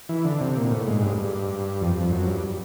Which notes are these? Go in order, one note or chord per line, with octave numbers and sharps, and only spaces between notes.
E3
D3
C3
A#2
A2
G#2
G2
G2
F2
F2
F#2
G2